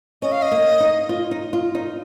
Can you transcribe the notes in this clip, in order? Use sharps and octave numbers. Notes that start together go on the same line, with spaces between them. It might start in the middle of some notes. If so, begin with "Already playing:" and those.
C#4 D#5
F5
D#5
A#3
D#4
F4
D#4
F4
D#4